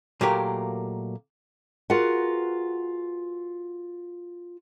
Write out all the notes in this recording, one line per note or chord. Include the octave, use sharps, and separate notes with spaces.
A#2 F#3 A3 A#3 G4 A#4
F4 F#4 G#4 A#4 B4 F#5